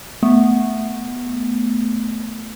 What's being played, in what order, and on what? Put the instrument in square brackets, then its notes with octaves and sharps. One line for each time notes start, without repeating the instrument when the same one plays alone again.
[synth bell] A3 B3